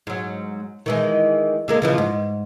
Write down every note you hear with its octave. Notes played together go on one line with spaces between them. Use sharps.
G#2 F#3
D#3 E3 G#3
D3 G#3 A#3
C#3 E3 F3
G#2